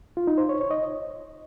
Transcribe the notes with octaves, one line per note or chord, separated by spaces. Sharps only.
F4
D#4
C5
C#5
C#5
D#5